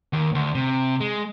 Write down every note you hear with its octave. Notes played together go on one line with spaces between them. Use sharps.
D#2
D2
C3
G#3